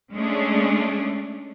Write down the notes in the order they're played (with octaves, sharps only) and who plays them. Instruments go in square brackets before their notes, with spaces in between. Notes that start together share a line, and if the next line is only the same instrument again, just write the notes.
[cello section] G#3 A3 C#4 D4 G#4